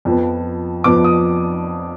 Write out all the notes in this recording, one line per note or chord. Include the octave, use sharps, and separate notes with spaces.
F2 F3 B3
F2 F3 B3 D6
D#6